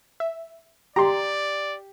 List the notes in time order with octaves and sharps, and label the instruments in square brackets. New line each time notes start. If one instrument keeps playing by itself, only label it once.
[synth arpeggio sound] E5
[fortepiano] G4 [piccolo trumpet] D5 [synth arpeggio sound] A#5 C6